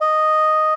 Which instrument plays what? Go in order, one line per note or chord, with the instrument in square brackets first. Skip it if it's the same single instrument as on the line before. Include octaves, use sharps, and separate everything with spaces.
[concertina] D#5